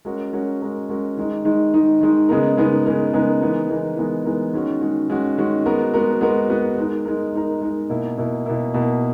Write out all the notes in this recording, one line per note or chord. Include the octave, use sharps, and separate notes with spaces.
G#3 C#4 F#4 A#4
G#3 C#4 F#4 A#4
G#3 C#4 F#4 A#4
G#3 C#4 F#4 A#4
D#3 G#3 D#4
D#3 G#3 D#4
D#3 G#3 D#4
D#3 G#3 D#4
C#3 G#3 B3 D#4 A#4
C#3 G#3 B3 D#4 A#4
C#3 G#3 B3 D#4 A#4
C#3 G#3 B3 D#4 A#4
E3 G#3 B3 D#4 A#4
E3 G#3 B3 D#4 A#4
E3 G#3 B3 D#4 A#4
E3 G#3 B3 D#4 A#4
D#3 G#3 C#4 F#4
D#3 G#3 C#4 F#4
D#3 G#3 C#4 F#4
D#3 G#3 C#4 F#4
G#3 B3 F#4 A#4
G#3 B3 F#4 A#4
G#3 B3 F#4 A#4
G#3 B3 F#4 A#4
G#3 D#4 A#4
G#3 D#4 A#4
G#3 D#4 A#4
G#3 D#4 A#4
B2 A#3 E4
B2 A#3 E4
B2 A#3 E4
B2 A#3 E4